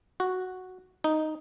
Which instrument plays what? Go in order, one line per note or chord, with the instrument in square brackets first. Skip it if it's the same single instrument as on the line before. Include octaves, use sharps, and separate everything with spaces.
[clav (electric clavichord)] F#4
D#4